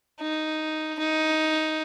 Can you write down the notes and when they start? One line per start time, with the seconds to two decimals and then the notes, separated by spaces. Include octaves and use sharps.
0.21 D#4
0.99 D#4